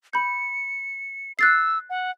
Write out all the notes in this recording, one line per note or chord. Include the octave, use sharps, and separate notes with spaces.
B5 G6 C#7
E6 F#6 A6 C7
F#5